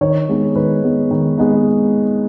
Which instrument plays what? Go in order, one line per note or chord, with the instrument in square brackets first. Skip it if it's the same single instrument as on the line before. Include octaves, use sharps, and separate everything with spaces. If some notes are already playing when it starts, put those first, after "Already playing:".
[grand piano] D#3 C#5
G#3 B3 D#4
D#3 B4
G#3 B3 D#4
D#3
G#3 B3 D#4